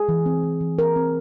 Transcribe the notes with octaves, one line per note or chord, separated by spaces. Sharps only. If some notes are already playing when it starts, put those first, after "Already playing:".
Already playing: G#4
E3
C4
E3
E3
C4 A#4
C4